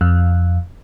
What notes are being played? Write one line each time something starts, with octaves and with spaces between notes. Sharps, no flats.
F2